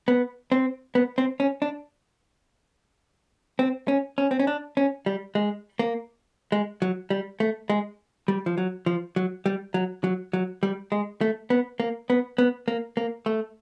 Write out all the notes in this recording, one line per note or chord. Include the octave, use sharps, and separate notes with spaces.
B3
C4
B3
C4
C#4
D4
C4
C#4
C#4
C4
C#4
D4
C#4
G3
G#3
A#3
G#3
F#3
G3
A3
G#3
G3
F3
F#3
F3
F#3
G3
F#3
F#3
F#3
G3
G#3
A3
B3
A#3
B3
B3
A#3
A#3
A3